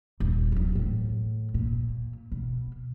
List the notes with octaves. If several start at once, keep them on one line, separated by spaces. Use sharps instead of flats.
D#1
F2 F#3
E2 A2
A#2
B2